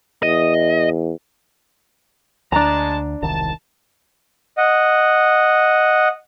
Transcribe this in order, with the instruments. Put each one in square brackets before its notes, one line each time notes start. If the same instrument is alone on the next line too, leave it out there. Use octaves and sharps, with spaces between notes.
[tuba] E2 [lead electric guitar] D#5
[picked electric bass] D2 [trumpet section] G#3 A5 [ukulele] D4 A#5
[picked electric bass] E1 C2 D#3 [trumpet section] A5
[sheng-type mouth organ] D#5 F#5